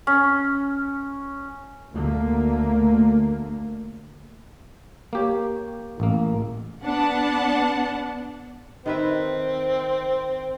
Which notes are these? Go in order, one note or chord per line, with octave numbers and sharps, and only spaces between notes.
C#4
D2 D3 A3 A#3
A#3 G4 C#5
A1 A#3
B3 D4 F#5 A5
D#3 C4 B4 E5